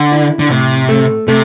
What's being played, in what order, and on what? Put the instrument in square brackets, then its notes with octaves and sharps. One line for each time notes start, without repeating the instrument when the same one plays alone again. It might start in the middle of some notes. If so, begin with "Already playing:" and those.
Already playing: [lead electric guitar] D3
[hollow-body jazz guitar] E4
[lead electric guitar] D3
[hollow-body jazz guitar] A2 [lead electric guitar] C3
[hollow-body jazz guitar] A3
[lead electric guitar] C3 [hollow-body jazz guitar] A3